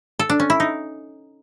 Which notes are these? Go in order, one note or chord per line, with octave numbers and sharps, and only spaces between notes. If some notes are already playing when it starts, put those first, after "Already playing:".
A4
D4
C#4
E4
D#4